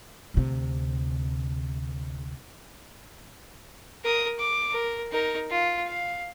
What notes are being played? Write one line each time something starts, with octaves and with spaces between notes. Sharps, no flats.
D2 C3
A#4 D#6
D6
A#4
D#4 A#4
F4
F5